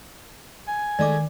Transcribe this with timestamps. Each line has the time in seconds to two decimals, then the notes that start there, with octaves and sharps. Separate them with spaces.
0.67 G#5
0.99 D#3 G#3 A3 D5 D#5 D6